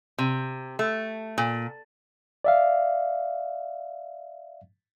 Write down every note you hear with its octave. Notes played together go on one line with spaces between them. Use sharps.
C3
A3
A#2
D5 E5 F5